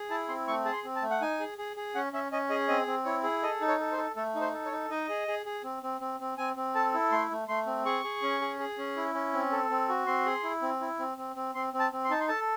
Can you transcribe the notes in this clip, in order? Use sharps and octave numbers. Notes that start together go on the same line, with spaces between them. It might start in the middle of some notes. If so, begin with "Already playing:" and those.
Already playing: G#4
E4 A5
C4 C6
A3 C#6
G#4 A5
C6
C4
A5
A3
F#5
D#4 G#5
G#4
G#4
G#4
C#4 F#5
C#4 E5
C#4 D#5
G#4 D#5
C4 D#5
C4
E4 C#5
G#4
A4 D#5
D#4
C#5
A4
C5
A4
A3 A4
D#4
C5
A4
C#5
D#4
D#4 D#5
G#4
G#4
G#4
C4
C4
C4
C4
C4 G#5
C4
A4 A5
E4
A3 C6
A3
A3 C6
C4
G#4 C#6
G#4
C#4
G#4
G#4
C#4
E4
C#4
C4
A4
C4
F#4
C4 C6
G#4
E4
C4
E4
C4
C4
C4
C4 C6
C4
A5
C4
C6
D#4 A5
C6
A4 A5